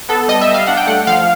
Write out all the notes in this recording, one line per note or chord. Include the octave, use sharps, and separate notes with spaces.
B3 A4
G3 D#5
E5
G3
F5
D4 F#5
G5
A3 F#5
F3 F5